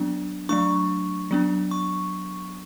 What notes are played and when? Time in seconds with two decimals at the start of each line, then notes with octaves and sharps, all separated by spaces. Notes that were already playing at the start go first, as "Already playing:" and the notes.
Already playing: F#3 B3 D4
0.49 F#3 A3 D4 C#6
1.31 F#3 B3 D4
1.71 C#6